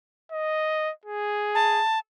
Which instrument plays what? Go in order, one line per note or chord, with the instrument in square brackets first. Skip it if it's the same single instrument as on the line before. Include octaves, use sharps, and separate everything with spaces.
[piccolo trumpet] D#5
G#4
[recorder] A5